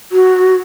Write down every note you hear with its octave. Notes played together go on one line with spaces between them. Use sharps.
F#4